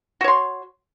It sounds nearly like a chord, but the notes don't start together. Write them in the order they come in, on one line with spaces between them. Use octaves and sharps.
F#4 C#5 C6